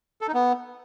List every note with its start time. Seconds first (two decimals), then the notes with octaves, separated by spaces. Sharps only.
0.21 A4
0.28 D#4
0.34 B3